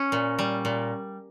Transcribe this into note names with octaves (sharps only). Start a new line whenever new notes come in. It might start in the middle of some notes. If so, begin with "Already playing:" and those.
Already playing: C#4
A#2
G3
A#2